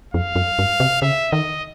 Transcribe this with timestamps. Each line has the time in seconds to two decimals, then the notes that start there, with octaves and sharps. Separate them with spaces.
0.14 F2 F5
0.36 F#2
0.59 G2
0.80 C3
1.02 C#3 E5
1.32 D#3 D#5